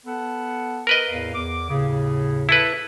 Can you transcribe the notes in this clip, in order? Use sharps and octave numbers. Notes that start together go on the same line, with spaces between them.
B3 A4 F#5
A#4 B4 D#5
E2 A2 F5
E2 D6
D#2 A2 C#3
E4 A4 B4